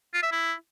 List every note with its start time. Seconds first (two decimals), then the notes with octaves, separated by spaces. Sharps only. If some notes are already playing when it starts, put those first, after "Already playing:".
0.13 F4
0.23 E5
0.32 E4